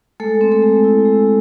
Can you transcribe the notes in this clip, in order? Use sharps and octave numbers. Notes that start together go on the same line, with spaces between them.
G#3 A3 A4
C4
A3 A4
G#3
E4
G#3